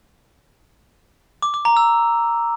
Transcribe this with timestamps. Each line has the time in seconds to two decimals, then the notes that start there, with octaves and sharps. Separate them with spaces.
1.42 D6
1.54 D6
1.65 A#5
1.77 E6